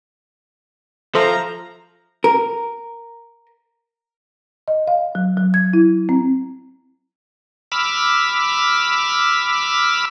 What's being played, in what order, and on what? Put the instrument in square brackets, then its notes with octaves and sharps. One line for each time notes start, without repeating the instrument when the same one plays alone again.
[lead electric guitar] F3 [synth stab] A4 C5 E5 [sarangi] A#5
[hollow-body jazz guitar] A#4
[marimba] D#5
F5
F#3
F#3
G#6
E4
C4
[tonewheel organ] B5 D6 E6 F6